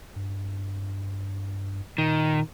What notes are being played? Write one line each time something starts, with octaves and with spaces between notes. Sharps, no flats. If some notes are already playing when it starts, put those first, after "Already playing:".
G2
A#2 D#3